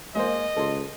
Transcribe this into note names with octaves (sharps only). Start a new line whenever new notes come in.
G#3 A#3 C5 D#5
C#2 A4 C6